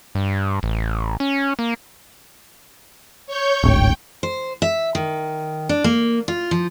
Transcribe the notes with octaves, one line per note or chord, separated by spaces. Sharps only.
G2
A1
C#4
A#3
C#5 C#6 G6
D1 G#1 G5
C5
E5
D#3
D4
A#3
F4
F3